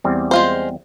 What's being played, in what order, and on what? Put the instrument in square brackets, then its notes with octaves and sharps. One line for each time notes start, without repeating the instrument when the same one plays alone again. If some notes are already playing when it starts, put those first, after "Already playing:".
[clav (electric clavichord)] E2 G3 C4
[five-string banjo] G#3 F4 C5